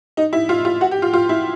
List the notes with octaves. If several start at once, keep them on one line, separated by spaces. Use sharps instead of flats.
D#4
E4
F4
F4
F#4
G4
F4
F4
E4